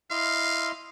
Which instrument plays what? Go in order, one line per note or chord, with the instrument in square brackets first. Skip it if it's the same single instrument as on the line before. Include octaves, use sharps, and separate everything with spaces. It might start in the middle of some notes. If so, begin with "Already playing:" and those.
[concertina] E4 D#5 C6 [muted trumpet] F5